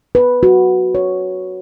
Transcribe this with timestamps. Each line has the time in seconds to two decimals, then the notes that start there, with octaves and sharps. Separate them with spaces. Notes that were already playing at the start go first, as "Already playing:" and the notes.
0.15 B4
0.43 F#4
0.95 C#5